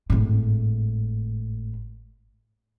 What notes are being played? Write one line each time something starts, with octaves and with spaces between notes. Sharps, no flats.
G#1 A2